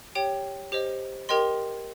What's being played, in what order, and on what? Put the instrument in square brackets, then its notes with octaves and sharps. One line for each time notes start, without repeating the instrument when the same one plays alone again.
[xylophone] G4 C#5 G5
G4 C5 D#5
G4 A#4 D#5 G5 C6